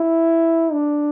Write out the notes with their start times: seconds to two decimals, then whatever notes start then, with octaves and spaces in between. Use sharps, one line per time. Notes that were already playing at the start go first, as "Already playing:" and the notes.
Already playing: E4
0.72 D4